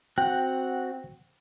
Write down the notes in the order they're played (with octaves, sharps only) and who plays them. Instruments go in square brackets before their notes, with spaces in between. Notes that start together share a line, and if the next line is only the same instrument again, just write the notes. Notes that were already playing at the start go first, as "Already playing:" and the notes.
[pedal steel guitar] C4 F#4 F#5 [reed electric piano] G5